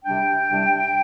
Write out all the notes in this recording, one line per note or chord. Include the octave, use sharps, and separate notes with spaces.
C2 C3 G3 D4 G5
C2 C3 G3 D4